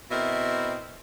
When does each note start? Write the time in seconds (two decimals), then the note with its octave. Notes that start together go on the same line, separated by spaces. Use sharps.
0.11 B2 C4 E4 A#4 D#5 E5